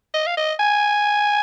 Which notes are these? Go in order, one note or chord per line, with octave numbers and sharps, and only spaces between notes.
D#5
F5
D#5
G#5